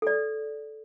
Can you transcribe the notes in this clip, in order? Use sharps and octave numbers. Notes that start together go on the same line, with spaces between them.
A4 D5